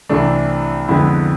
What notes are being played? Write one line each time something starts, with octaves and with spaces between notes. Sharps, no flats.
C2 C3 E3 A3 D4
F2 D3 G#3 B3 E4